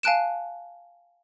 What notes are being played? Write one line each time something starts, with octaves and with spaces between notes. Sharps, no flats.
F5 G#5 A5 F#6 D7 E7